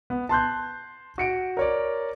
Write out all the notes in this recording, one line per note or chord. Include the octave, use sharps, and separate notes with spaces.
B3
A5 C6 F#6 G6
F#4 C#7 D7
A#4 C#5 D5